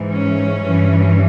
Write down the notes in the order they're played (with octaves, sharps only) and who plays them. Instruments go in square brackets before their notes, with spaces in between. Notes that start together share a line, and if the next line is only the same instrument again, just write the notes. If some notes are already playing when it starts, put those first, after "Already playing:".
Already playing: [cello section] G#2 E3
C#4
G2 E3